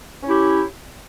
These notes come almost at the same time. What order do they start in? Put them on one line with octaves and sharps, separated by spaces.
C#4 E4 G4